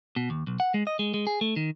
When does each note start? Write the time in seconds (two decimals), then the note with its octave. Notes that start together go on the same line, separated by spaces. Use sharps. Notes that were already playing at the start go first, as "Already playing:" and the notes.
0.16 B2
0.30 D#2
0.47 B1
0.60 F#5
0.74 G#3
0.87 D#5
0.99 G#3
1.14 G#3
1.27 G#4
1.41 A3
1.56 D#3